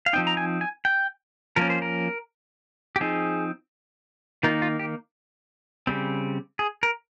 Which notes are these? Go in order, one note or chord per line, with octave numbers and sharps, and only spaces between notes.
F5
F3 C4 D#4 G5
A#5
G#5
G#5
G5
F3 A#3 C#4 A#4
C5
A#4
G4
F3 C4 D#4 G#4
D#3 A#3 D#4 F4
F4
G4
C#3 G3 C4
G#4
A#4